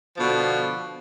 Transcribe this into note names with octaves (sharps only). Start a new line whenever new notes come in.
B2 D3 F3